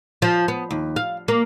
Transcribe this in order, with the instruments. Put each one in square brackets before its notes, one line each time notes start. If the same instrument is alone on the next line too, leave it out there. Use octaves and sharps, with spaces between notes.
[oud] F3
B3
D#2
F5
A#3